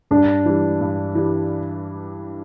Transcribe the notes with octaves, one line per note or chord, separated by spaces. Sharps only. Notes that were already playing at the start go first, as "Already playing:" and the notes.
G2 D4
E3 G3
G2
E3 G3